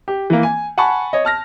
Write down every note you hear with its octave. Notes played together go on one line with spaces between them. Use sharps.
G4
E3 A#3
G#5
F#5 G#5 A5 B5 C#6
C#5 D#5
A5 F6 A#6